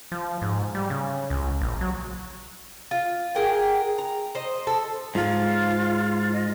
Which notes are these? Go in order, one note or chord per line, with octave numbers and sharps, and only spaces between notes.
F3
G#2
G3
C#3
C#2
A#1
F#3
F4
G#4 A#4 F#5 G5
A#5
C5 D#5
A4
G#2 F4
D#5